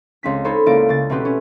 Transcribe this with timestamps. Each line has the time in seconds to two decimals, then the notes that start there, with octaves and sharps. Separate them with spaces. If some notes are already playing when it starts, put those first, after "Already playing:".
0.23 C#2 C4 B6
0.45 D#4 A4 C5 C#5 B5
0.66 C#2 A#3 E4 D5 D7
0.89 C#3 A6
1.10 B2 A3 C4 C#4 G4 B4
1.25 C#4